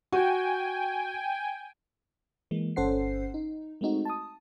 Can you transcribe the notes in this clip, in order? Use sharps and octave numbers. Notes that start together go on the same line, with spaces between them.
F#4 G5 G#5
E3 G#3 A#3
G1 C#4 A4 C5 F#5 C7
D#4
G#3 A3 C4 D#4 F#4
A5 D#6